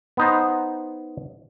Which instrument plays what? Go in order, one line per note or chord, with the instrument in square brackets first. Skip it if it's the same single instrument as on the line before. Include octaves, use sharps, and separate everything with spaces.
[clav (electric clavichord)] B3 D#4 C5